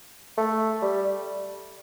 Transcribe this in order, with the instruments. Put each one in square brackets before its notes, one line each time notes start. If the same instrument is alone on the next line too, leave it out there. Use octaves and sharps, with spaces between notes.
[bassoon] A3
G3